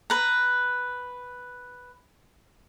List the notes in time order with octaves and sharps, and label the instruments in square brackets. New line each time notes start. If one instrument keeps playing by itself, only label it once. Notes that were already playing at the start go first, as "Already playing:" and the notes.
[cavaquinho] B4 A#5